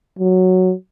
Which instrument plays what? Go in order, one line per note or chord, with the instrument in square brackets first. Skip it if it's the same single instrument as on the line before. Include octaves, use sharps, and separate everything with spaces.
[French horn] F#3